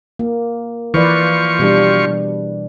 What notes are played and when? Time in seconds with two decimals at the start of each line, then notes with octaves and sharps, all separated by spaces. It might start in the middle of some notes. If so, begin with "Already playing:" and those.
0.19 A#3
0.94 E3 F3 B4 D5 C#6
1.59 B2 G3 D4